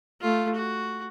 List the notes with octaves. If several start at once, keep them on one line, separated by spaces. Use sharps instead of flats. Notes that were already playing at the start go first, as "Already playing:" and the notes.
A3 F4
F#4